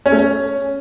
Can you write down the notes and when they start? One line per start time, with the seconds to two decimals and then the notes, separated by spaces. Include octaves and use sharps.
0.06 C#4
0.12 A3
0.18 C#4